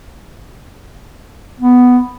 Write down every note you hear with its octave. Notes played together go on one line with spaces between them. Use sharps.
B3